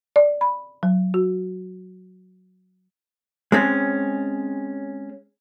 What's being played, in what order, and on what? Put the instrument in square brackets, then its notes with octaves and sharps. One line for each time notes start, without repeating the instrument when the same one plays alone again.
[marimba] D5
B5
F#3
F#4
[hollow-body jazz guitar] G#3 C4 C#4